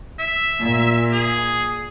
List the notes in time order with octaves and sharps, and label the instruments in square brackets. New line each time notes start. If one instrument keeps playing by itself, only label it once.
[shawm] E5
[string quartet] A#2
[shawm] G#4